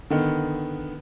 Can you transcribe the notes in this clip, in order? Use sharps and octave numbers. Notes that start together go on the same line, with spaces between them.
D3 D#3 B3